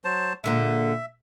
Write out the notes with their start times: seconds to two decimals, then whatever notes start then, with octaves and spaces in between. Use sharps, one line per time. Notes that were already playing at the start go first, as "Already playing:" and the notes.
0.04 F#3 C5 A5
0.44 A#2 D3 G#3 E5